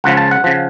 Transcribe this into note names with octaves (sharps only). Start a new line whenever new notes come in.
C#2 C#3 F3 F#5
A5
F#5
C#3 F3